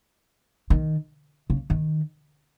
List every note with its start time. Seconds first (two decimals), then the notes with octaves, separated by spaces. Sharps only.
0.70 D#3
1.50 C#3
1.70 D#3